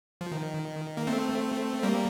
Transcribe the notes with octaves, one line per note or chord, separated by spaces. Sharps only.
F3
D#3
A#3
A3 C4
G3 A#3